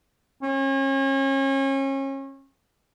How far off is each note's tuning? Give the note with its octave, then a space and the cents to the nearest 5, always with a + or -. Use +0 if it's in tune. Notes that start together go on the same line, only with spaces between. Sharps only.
C#4 -35